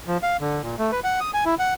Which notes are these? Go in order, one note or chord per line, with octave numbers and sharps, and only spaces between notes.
F3
F5
D3
A#2
A3
B4
F#5
D#6
G#5
E4
F#5